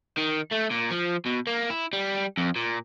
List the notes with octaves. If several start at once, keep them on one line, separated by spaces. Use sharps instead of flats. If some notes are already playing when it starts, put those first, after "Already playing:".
D#3
A3
A#2
F3
B2
A#3
E4
G3
F2
A#2